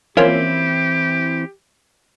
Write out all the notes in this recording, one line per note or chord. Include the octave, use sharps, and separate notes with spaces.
E3 F3 A#3 C4 C#4 E4 G4